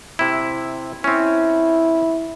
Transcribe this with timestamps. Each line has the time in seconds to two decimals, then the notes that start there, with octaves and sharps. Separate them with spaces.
0.19 C3 E4
1.04 C4 C#4 E4